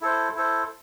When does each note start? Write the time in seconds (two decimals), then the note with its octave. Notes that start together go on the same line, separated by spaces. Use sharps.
0.01 E4 A4 C5
0.35 E4 A4 C5